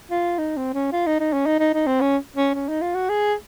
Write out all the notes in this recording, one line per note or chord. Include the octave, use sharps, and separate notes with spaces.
F4
D#4
C4
C#4
F4
D#4
D#4
C#4
D#4
D#4
D#4
C4
C#4
C#4
C#4
D#4
F4
F#4
G#4